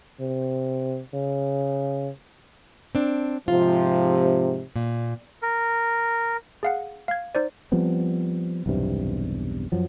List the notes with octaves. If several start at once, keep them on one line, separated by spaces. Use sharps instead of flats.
C3
C#3
C4 D4
G#2 C3 F3 F4
A#2
A#4
G#4 F5 F#5
F5 G#6
D#4 C5 D5
F3 G3 B3 C4
B1 E2 G2 C3
F#2 F3 F#3